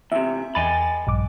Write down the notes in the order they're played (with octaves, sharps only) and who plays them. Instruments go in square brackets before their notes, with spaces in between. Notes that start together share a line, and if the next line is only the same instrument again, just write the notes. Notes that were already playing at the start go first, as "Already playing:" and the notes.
[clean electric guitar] E2 C3 [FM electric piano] E5
[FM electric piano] E2 A6 [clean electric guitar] D#5 G#5 B5
[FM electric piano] A#1 G2 D6